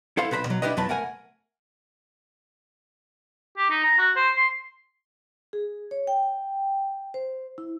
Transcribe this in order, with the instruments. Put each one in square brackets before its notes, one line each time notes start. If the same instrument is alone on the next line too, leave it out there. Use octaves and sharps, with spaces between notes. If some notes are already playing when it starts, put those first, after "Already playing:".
[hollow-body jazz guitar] E4 A4 C5 F5
B1 B4 C5 A#5 B5
B2 F#3
D4 E4 F4 G4 B4 D#5
F2 B2 F#3 B4 A5 B5
A3 A#4 F#5 G#5
[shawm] G4
D#4
A#5
F#4
C5
C6
[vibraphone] G#4
C#5
G5
C5
E4